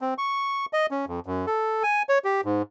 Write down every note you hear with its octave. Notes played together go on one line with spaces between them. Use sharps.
C4
C#6
D#5
C#4
F2
F#2
A4
G#5
C#5
G4
G#2